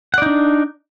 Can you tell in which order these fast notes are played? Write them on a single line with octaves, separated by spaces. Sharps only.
F#5 D5 D#4 D4